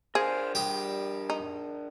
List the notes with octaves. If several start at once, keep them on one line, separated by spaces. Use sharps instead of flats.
D4 G#4 A#4 C5 F5
G3 G4 G5 D#6
D#4